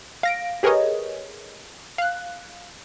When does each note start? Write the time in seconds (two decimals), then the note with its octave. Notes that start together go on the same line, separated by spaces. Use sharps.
0.23 F5 A#6 D7
0.63 G4 G#4 A#4 B4 C#5 D#5
1.98 F5 F#6